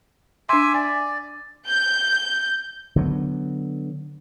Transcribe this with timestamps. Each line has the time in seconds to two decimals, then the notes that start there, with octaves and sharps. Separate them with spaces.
0.49 D4 E5 G#5 C6 D6
0.74 D5 G#5
1.68 G6
2.96 D3 F#3 A3 B3